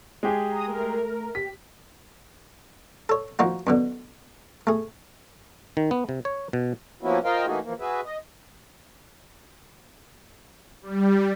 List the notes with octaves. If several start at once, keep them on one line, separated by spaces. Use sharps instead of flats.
G#3 G4 G#4
A#5 D#6
A3 A#4
G4 B6
A4 C#5
F3 A#3 D#4 F#4
F#2 B2 D3
A3 G#4
D#3
B3
C3
C#5
B2
F3 A#3 B3 C#4 E4 F#4
F4 A#4 C5 D#5 F5 G5
E3 A3 A#3 D#4 F#4 G#4
E3 F3 A#3
F#4 G#4 B4 E5
D#5
G3